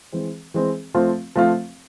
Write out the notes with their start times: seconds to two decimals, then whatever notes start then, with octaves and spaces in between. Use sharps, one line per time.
0.12 E3 G#3 C4
0.54 E3 G#3 C4
0.94 F3 A3 C4 F4
1.36 F3 A3 C4 F4